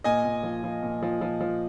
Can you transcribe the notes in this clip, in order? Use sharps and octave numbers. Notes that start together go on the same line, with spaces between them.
A#2 D#5 G#5
A#2
F3
F3
A#2
F3
F3
F3